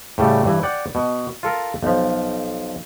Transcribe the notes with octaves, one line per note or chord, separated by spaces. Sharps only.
A2 C#3 G3 A3
G2 E3
D5 F#5 G5
B2
F4 A4 A#4
B1 F3